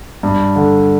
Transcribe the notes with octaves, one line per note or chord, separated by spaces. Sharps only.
G2
D3